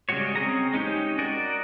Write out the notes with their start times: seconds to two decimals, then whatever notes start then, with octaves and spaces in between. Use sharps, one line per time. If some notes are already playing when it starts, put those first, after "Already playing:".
0.09 C#3 G3 G#3 F#4 C#5
0.36 C4 C#4 G#4 A#5
0.74 G#3 C#4 D#4 G4
1.19 F#4 A#4 D5 D#5